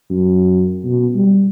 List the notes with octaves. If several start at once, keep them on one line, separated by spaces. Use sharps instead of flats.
F#2
B2
G3